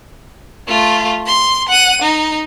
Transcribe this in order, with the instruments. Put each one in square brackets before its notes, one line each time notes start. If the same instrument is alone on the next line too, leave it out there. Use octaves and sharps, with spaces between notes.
[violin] A3 F4
C6
F#5 D#7
D#4